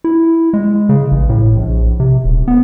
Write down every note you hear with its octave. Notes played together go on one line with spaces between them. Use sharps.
E4
G#3
C#3
A1
A2
A#1
C3
D#1
B3